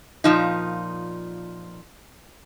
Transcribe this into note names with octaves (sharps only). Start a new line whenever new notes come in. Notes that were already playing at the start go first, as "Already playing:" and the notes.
A#2 F3 D#4